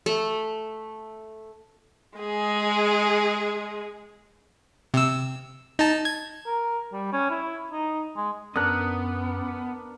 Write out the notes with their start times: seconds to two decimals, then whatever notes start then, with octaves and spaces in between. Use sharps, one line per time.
0.06 A3
2.19 G#3 G#4
4.94 C3 E6
5.79 D#4 A5
6.05 G#6
6.46 A#4
6.93 G3
7.13 C#4
7.30 E4
7.71 D#4
8.16 G#3
8.56 F#2 B3 D4 A#4 D#6 F#6